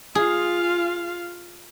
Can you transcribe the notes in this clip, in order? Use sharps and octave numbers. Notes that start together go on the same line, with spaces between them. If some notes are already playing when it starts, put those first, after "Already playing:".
F4 G#4 F5